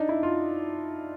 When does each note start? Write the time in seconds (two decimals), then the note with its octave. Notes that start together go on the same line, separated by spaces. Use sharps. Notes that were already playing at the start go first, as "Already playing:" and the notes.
Already playing: D4 D#4
0.09 E4
0.23 F4